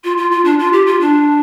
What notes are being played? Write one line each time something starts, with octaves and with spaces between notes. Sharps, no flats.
F4
F4
F4
D4
F4
G4
F4
D4